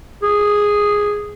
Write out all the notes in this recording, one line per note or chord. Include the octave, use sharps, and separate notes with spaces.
G#4